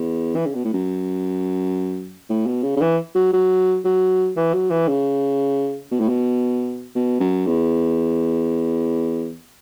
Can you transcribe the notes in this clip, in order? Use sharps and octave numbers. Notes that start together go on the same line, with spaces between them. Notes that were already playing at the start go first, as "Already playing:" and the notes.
Already playing: E2
E3
C#3
B2
A2
F#2
A2
B2
C#3
C#3
E3
F#3
F#3
F#3
E3
F#3
E3
C#3
B2
A2
B2
B2
F#2
E2